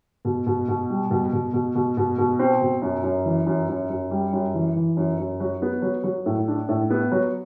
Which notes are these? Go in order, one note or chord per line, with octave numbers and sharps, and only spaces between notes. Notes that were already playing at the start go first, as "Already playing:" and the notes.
B2
B2
B2
G3
B2
B2
B2
B2
B2
B2
C4
B2
F#2
F#2
E3
F#2
F#2
F#2
G3
F#2
E3
E3
F#2
F#2
F#3
B3
F#3
F#3
A2
D4
A2
B3
F#3